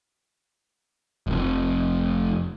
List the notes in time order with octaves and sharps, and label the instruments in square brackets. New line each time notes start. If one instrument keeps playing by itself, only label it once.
[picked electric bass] F1 F2